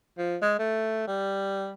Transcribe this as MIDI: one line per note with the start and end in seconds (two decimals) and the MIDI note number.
0.18 0.37 53
0.42 0.55 56
0.59 1.06 57
1.08 1.71 55